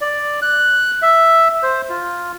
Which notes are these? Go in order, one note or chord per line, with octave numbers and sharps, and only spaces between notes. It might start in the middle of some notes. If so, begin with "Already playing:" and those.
D5
F#6
E5
C5
F4